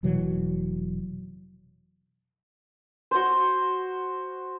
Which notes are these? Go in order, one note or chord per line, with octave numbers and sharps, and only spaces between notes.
F1 B2 E3 F#3
F#4 C5